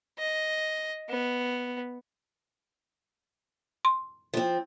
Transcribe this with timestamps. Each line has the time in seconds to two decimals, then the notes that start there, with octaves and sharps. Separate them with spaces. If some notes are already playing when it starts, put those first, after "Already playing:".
0.19 D#5
1.10 B3
3.85 C6
4.34 F3 C4